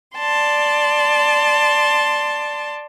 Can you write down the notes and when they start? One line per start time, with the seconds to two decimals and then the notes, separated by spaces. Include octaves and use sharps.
0.17 D5 A5 C6